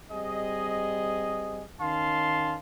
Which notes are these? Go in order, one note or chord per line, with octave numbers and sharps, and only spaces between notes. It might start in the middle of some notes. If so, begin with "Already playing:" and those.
G3 C4 G#4 D#5
D#3 C#4 F5 A5 C6